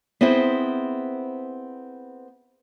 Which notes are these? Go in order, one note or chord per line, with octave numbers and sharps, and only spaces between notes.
B3 C4 E4 G#4 C5